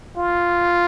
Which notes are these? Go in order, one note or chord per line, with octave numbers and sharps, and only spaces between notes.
F4